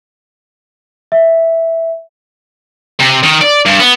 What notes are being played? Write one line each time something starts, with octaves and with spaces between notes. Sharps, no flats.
E5
C3
D#3
D5
G2
B3